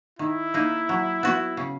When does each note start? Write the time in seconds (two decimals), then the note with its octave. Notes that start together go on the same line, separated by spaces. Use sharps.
0.19 D#3 E4
0.54 A#3 D#4
0.89 F#3
1.23 B3 F#4
1.57 C#3